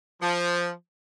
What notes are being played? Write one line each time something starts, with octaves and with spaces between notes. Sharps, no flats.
F3